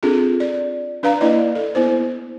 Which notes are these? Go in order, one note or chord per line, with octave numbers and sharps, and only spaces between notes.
C4 D4 F4 G#4 A4
D5
D4 B4 D5 F5 A#5
A#3 D4 E4 D5 D#5
A4
B3 E4 C5